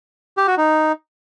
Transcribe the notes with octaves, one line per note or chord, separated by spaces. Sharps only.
G4
F#4
D#4